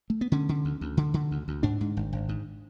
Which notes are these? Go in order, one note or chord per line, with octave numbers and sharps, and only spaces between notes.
A3
B3
D3 C#4
D3
D2
D2
D3
D3
D2
D2
G#2 D4
G#2
G#1
G#1
G#2